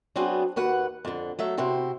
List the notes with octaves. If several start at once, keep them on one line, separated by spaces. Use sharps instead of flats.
F#3 B3 C4 D4 F#4 G#4
D#2 F#4 B4 F#5
F2 D3
F#3 A3 E5
C3 C4 E4 F#4